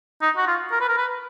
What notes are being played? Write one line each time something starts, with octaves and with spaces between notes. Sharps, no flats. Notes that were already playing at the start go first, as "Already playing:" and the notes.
D#4
F#4
F4
A#4
B4
A#4
B4